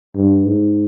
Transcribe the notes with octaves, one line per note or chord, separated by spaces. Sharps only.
G2
G#2